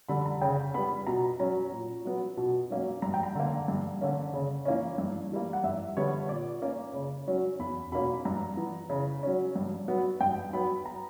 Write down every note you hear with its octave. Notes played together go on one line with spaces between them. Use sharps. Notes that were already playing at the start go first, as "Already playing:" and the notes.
D3 G3 B5
A#5
C#3 G5
G3 B3 B5
B2 A#5
F#3 C#4 A#5
A#2
F#3 B3
B2
F#3 A#3 C#4
G2 A#5
G5
A#5
D3 A#3
G2
D3 A#3 C#4
C#3
E3 A#3 C#4
G2
E3 G3 A#3
F#5
G2 E5
D3 G3 B3 C#5
A#2 D5
A#3 C#4
C#3
F#3 C#4
E2 B5
B2 A#3 C#4 B5
G2 A#5
E3 B3
C#3
F#3 C#4
G2
F#3 B3
G2 G5
F#3 B3 B5
A#5